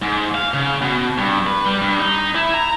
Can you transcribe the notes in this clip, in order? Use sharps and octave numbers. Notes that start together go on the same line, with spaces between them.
G#2
F5
C#3
B2
G2
B4
G3
G2
D#4
E4
A#5